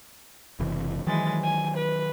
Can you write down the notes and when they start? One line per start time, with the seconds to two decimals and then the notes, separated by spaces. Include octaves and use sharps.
0.60 F#1 C3 E3
1.07 D#3 E3 F#3 G#3 A6
1.43 G#5
1.77 B4